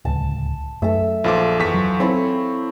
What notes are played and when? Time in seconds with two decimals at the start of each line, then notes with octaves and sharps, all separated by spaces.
0.05 D1 C#2 A5
0.82 F#2 A3 A4 E5
1.24 A#1 F4 A4 C5 D6
1.59 E2 C#6 B6
1.74 F#3
2.00 C4 E4 A4 C#5